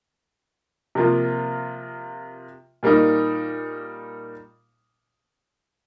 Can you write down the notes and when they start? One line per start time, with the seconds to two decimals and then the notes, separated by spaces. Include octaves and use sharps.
0.95 C3 F3 A#3 F4
2.83 A#2 G3 A#3 D#4